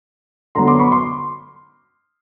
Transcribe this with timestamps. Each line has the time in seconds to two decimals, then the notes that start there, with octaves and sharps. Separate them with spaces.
0.55 D3 F#3 B3 A#5 C6
0.67 C6 D6
0.79 B5 C#6
0.91 C6 D6